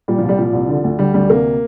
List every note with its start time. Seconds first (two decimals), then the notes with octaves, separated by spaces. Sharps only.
0.08 A#2 G3
0.18 F3
0.23 C2
0.29 G3
0.38 A#2 F3
0.53 C2
0.69 D3
0.84 D2
0.99 D3 G3
1.14 D2 G3
1.29 C3 A#3